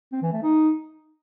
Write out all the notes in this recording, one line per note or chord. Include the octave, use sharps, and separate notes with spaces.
C4
E3
A3
D#4